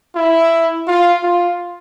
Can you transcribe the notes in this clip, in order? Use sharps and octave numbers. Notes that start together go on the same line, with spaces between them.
E4
F4
F4